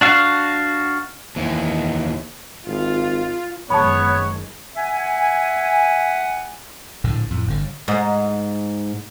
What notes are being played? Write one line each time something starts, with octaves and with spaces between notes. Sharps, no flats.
D4 F#4 F5
D#2 E3
G#1 F4
F#1 D#3 G#3 B3 C#5 A5 B5
E5 F#5 G#5
A#1 A2 D3
F2 A2
G1 D3
G#2